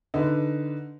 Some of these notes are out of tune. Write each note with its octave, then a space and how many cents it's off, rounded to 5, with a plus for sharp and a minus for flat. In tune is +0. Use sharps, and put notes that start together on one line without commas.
D3 +0 D#4 +0 B4 +0